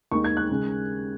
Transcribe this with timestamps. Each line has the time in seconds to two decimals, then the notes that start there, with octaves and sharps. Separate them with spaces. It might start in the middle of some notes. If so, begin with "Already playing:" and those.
0.11 D#2 D#3 G#3 D#4 C#6
0.24 G#6
0.37 F#6
0.51 C#3 G#3